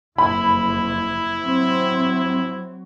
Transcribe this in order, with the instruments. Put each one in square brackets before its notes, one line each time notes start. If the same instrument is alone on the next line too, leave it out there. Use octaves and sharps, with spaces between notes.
[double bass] F#1 F2 [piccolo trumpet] E4 [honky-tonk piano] B5
[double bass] F#3 [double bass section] C4